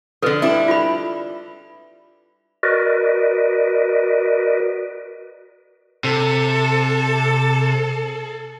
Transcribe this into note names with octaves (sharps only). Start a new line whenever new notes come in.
D3 F3 A4 B4
G3 D4 E4
F4 B5
F#4 A#4 B4 D5 D#5
C3 A4